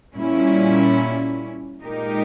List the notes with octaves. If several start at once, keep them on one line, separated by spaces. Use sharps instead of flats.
A#2 G3 C#4 E4
A#2 G#3 D#4 G4 A#4